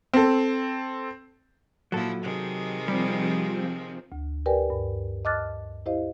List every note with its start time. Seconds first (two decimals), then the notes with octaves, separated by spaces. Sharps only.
0.14 C4 A4
1.92 A#2 F3 F#3 E4 A4
2.22 C3 D#3 G#3
2.88 F3 G3 C4
4.12 D2
4.46 G4 A#4 B4 D5 G5 G#5
4.70 G2
5.25 D#5 A5 D6 F6 F#6 A6
5.86 E4 G4 C5 D#5 F5